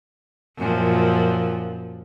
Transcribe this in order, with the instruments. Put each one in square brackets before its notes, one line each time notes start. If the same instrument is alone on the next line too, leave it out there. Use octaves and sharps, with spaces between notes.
[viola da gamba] F#2 A#2 F3